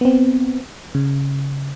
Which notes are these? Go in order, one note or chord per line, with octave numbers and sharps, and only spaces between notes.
B3 C4
C#3